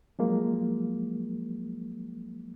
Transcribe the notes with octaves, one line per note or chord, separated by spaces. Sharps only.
F3 F#3 G#3 A#3